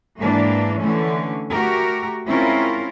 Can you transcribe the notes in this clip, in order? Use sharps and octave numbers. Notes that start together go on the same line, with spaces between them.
G#2 E3 A#3 D4
D3 E3 A3 C#4
A3 F#4 G4 A#4
G#3 C4 C#4 E4 F4 A#4